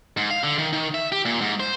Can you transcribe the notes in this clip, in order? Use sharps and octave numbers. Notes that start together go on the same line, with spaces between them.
G#2
F5
D3
D#3
D#3
E5
G4
A#2
G#2
C5